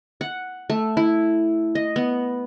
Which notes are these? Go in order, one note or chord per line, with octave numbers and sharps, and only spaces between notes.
F#5
A3
E4
D#5
B3